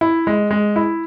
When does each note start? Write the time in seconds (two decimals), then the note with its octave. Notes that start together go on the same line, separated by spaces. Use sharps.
0.01 E4
0.27 G#3
0.51 G#3
0.76 E4